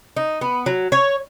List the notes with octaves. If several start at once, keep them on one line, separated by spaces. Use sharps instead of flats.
D#4
B3
F#3
C#5